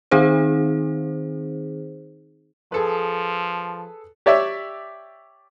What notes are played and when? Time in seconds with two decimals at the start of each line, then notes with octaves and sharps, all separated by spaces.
0.11 D#3 C4 D#4 G#4 C5
2.72 F3 G#4 A4 B4
4.26 G4 C#5 D5 E5